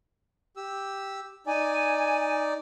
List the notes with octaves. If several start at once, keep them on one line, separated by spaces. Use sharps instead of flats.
G4 E6
D#4 D5 G#5